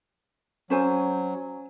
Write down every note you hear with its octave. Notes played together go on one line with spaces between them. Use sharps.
F#3 C#4 C5 G#5